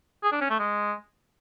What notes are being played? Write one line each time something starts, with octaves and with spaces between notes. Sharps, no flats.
G#4
D4
C#4
A3
G#3